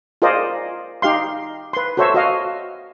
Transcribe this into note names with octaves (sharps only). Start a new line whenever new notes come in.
F4 G#4 A#4 C5 D5 D#5
D#4 G4 F5 C6
B4 C6
F#4 A4 C5 C#5 E5
F#4 D#5 F5